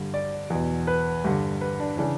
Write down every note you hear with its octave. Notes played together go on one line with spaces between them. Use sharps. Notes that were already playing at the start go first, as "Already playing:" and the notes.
Already playing: G2 D3
D5
E2 B2
B4
G2 D3
B4
D4
C#3 E3 D4